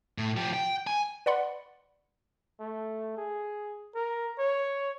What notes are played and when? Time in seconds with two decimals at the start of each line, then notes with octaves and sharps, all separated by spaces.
0.18 A2
0.37 F3 G4
0.53 G5
0.87 G#5
1.26 B4 D5 F#5 B5 C6
2.60 A3
3.17 G#4
3.95 A#4
4.38 C#5